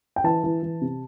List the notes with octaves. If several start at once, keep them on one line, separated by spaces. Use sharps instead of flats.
G5
E3 A5
E3
E3
C3